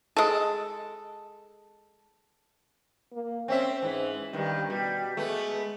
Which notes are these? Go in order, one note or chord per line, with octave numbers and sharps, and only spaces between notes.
G#3 A4
A#3
C4 C#4 C5 E5
G#2 E3
G2 D#3 G3
B2 G3
G#3 A3 B3